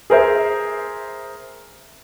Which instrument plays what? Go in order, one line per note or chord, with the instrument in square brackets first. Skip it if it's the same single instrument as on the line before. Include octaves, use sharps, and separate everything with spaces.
[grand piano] G#4 A#4 C5 E5